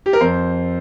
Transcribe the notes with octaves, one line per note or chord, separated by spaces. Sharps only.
G4
A#4
F2 C5